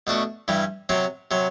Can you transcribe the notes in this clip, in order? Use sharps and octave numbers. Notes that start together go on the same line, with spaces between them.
B2 A3 D4 F#4
G2 E3 G3
C3 F#3 C4
C3 F#3